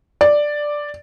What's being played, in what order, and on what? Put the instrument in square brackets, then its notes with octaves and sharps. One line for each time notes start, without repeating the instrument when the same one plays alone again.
[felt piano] D5